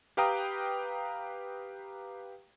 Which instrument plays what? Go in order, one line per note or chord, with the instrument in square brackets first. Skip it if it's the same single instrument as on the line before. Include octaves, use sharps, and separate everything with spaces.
[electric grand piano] G4 B4 F5 G5 A#5 D#6